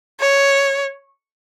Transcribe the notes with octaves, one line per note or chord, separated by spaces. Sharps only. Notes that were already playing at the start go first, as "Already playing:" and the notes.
C#5